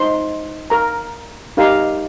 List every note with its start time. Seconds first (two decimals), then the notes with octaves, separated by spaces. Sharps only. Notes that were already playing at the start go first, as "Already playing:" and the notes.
Already playing: D#4 C5 C6
0.70 A#4 A#5
1.57 D#4 G4 A#4 F5